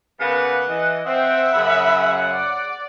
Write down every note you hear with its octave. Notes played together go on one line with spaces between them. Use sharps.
C#3 A#3 B3 F#5
E3 D#5
C4 C5 E5 F#5 G5
F#2 C#3 B5
D5